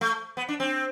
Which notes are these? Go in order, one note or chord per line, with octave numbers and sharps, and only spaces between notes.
A3
B3
D4
C4